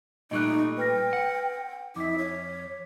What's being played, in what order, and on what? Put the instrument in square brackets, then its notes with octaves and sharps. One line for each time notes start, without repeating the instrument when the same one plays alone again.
[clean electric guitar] A#2 G3 A3 [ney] D#4 [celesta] D#5 C#6 F#6
[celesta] B4 F6 A#6 [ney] G5
[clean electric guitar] F#5
[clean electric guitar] F2 [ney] E4 [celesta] D6 B6
[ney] C#5